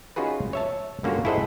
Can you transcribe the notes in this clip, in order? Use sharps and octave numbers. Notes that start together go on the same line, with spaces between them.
C#4 D#4 F4 F#4 G#4 B4
C#5 E5 A5
G2 D3 A#3 C#4 F4 F#4
E4 G#4 A4 C5 D#5 F#5